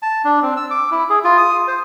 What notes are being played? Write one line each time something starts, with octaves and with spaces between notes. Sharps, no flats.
A5
D4
C4
E6
D6
E4
G#4
F4
D#6
C5